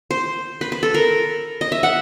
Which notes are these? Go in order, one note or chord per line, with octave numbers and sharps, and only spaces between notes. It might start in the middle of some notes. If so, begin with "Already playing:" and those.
C5
B4
B4
A4
A#4
D#5
E5
F#5